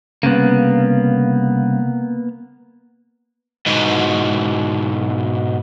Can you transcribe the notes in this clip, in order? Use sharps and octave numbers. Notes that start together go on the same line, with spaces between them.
C2 C#3 A#3 B3
G#2 B2